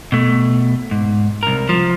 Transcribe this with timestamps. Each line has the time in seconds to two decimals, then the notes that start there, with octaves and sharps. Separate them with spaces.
0.12 B2 A3
0.91 G#2
1.43 C2 A#4
1.69 F3